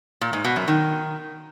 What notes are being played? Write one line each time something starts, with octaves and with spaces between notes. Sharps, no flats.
A#2
G#2
B2
F#2
D#3